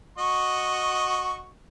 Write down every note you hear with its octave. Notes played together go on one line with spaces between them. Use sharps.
F#4 D#5 C#6